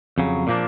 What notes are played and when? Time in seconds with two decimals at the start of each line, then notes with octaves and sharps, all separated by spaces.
0.18 F2 C#3 F#3
0.47 A#2 F3 A#3 D4